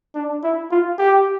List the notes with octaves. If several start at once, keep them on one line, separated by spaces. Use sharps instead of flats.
D4
E4
F4
G4